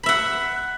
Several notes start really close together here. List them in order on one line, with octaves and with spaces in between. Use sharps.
B5 E5 F#5